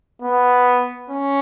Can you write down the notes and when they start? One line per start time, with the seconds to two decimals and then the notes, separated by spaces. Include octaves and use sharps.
0.22 B3
1.10 C#4